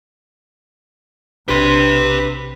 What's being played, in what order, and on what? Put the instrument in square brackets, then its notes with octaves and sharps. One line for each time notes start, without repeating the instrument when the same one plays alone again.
[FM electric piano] B1 D4 B6 [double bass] C3 [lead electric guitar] G4 C6 [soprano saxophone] B4